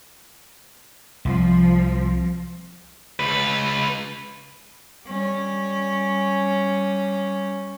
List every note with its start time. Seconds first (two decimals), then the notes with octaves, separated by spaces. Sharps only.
1.25 C2 F3
3.19 C#2 B4
5.05 G3 C#4